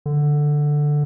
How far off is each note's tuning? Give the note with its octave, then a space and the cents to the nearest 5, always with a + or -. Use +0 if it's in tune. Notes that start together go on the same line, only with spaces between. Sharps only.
D3 +5